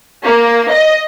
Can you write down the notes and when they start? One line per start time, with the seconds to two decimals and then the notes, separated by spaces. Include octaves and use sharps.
0.24 A#3
0.71 D#5